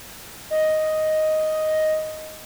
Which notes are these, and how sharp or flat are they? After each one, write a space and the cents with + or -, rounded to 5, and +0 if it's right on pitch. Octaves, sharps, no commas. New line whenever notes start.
D#5 +5